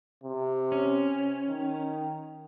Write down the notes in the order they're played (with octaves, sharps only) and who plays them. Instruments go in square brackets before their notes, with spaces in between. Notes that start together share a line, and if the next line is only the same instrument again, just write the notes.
[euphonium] C3
[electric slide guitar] C#4
[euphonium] D#3